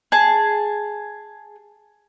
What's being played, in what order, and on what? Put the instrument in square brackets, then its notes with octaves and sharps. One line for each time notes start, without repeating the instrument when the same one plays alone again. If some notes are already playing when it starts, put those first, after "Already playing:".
[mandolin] G#4 A5